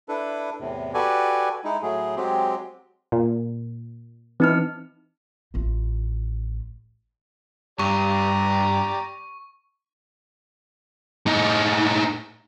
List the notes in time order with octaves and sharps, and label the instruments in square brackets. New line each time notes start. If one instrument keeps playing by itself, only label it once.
[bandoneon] D4 E4 A4 B4
E2 A2 C3
F#4 G4 A4 B4 D5 G#5
G#3 D#4 E4
A2 F#3 A3 G#4
F#3 G#3 C4 G4
[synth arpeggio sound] A#2
[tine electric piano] E3 [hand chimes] C4 D#4 F6
[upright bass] A1 F4
[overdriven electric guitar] G2 [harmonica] G4 D5 A#5 [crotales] C#6
[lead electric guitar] A2 D#4